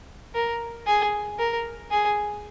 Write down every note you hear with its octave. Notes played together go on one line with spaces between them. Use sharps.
A#4
G#4
A#4
G#4